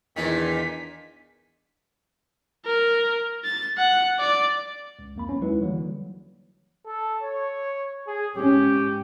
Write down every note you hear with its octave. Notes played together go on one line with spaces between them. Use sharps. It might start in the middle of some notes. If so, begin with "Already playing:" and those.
E2 A#2 D#3 D4 B6
A#4
A6
F#5
D5
C#2
F2 A#3 B5
G1 C2 B3 C#4
D#2 F#3 G#3 D#4 E4 B4
D3 E3 F#3 G3 A#3
A4
C#5
G#4
G#2 C#4 G4